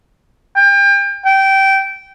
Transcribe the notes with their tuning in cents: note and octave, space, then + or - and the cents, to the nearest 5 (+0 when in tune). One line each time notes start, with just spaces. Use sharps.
G5 +35
G5 -15